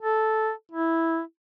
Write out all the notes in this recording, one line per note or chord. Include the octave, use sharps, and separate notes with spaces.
A4
E4